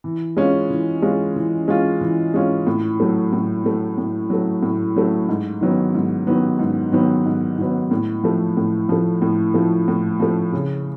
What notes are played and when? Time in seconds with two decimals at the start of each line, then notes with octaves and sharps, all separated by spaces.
0.04 E3
0.37 G#3 C#4 F4
0.70 E3
1.02 G#3 C#4 F4
1.36 E3
1.68 G#3 C#4 F4
2.01 E3
2.34 G#3 C#4 F4
2.67 A2
3.00 F#3 A3
3.33 A2
3.64 F#3 A3
3.98 A2
4.30 F#3 A3
4.63 A2
4.96 F#3 A3
5.29 G#2
5.61 D#3 F#3 B3
5.94 G#2
6.27 D#3 F#3 B3
6.59 G#2
6.92 D#3 F#3 B3
7.26 G#2
7.58 D#3 F#3 B3
7.91 A2
8.24 F3 A3
8.57 A2
8.89 F3 A3
9.22 A2
9.54 F3 A3
9.88 A2
10.20 F3 A3
10.53 C#3